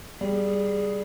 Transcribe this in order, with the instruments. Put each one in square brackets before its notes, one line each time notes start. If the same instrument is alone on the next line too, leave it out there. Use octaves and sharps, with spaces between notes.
[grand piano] G3 [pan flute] G#4